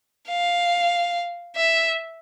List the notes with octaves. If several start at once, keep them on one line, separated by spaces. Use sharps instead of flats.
F5
E5